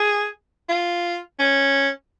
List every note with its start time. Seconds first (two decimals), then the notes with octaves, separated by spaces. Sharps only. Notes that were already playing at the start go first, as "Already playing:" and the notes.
Already playing: G#4
0.69 F4
1.39 C#4